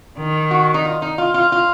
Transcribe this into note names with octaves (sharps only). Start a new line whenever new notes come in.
D#3
F#4
D#4
F4
D#4
F4
F4
F4